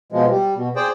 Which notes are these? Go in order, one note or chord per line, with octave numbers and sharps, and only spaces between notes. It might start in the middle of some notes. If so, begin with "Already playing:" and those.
B2 F3 G#3
G3
B2
G#4 C5 D5 G5